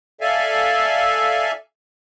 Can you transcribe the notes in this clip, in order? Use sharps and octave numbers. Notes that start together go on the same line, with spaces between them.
A4 D5 E5 F5 G#5